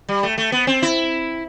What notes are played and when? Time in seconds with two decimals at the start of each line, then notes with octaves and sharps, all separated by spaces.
0.09 G3
0.23 A3
0.38 A3
0.52 B3
0.67 C4
0.82 E4